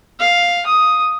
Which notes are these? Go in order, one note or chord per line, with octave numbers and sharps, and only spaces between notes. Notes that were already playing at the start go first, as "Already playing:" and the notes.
F5
D#6